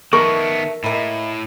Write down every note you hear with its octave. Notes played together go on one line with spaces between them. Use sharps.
D#3 A3 B3 A#4 C#6
A2 G#3 A#3 E4